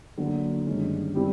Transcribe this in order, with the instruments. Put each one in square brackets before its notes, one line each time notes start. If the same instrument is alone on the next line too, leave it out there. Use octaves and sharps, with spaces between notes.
[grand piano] D3 F#3 A#3
G2 D#3 G#3 C#4
G3 C4 E4 G4